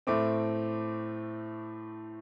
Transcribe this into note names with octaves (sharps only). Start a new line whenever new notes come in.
A2 A3 C4 D6